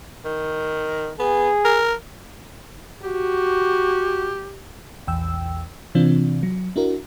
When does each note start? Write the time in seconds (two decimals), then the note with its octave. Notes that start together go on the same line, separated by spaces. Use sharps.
0.25 D#3
1.19 B3 G#4
1.65 A#4
3.03 F#4 G4
5.07 A#1 E2 G5 E6
5.95 C3 E3 C4 D4 F4
6.43 F#3
6.76 D4 E4 F#4 A#4